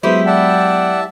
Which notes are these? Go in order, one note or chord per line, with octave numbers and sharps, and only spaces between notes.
F#3 G#3 B3 E4 G4 C5 D#6
D5 E5 F#5 G5 A5